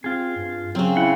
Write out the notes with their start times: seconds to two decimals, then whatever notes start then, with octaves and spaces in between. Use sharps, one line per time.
0.04 C4 F4 G#4
0.37 G2
0.75 C#3 F#3 C4
0.97 E4 F#5